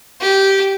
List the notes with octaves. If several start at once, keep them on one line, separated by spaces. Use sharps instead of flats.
G4